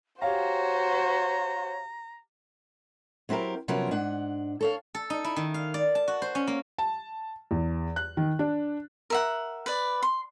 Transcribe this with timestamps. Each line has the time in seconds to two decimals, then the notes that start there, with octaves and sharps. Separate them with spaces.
0.22 F#4 G4 C5 C#5 F5 A#5
3.29 F#3 C4 E4 G4 A#4
3.68 C3 F3 F#3 B3 C#4 A#4
3.91 G#2 D4 F#5
4.61 A4 C#5 F5
4.95 A4
5.10 D#4
5.24 E4
5.36 D#3
5.54 F5
5.74 D5
5.95 A5
6.08 F#4
6.22 C5
6.35 C#4
6.47 A#3
6.78 A5
7.51 E2
7.96 F#6
8.17 D#3
8.39 D4
9.10 A#4 E5 F#5
9.66 B4 D5
10.03 C6